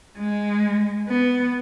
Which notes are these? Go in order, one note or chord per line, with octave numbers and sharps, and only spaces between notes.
G#3
B3